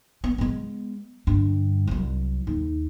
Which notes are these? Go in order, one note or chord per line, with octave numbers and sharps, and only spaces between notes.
B3
G#3 B3
G2 D3
C2 F#3
D#2